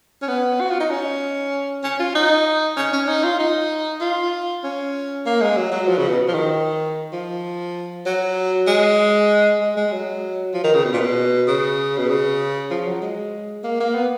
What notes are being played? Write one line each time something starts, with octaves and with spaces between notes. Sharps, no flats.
C#4
B3
F#4
F4
D#4
C#4
C#4
F4
D#4
C#4
C#4
D#4
F4
D#4
F4
C#4
A#3
G#3
F#3
F#3
F3
C#3
B2
F3
D#3
F3
F#3
G#3
G#3
G#3
F#3
F3
D#3
C#3
B2
A#2
B2
C#3
B2
C#3
F3
F#3
G#3
A#3
A#3
B3